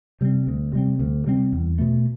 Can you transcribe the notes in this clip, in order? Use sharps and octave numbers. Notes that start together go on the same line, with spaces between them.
C3 G3 C4
D2
C3 G3 C4
D2
C3 G3 C4
E2
B2 A3